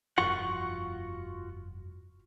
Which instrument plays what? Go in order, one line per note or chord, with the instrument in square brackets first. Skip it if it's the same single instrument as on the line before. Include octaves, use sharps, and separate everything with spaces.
[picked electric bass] F1 G2 F3 [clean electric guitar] F4 F#4 F#5 [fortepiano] C#6